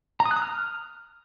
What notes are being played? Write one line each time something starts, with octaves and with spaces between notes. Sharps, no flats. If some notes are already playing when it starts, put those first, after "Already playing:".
A#5
D#6
F#6
D#6
F6